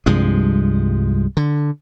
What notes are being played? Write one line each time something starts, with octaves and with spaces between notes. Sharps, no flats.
C2 G2 F3 G#3
D3